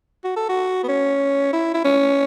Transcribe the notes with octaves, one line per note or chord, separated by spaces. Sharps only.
F#4
A4
F#4
B3
C#4
E4
E4
C#4